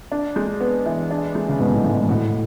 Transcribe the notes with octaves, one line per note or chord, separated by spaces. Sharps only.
D4
G#3
B3
E3
D4
G#3
C#3
G#2 B2 B3
A2
G#2 E3
G#2
A2 F#4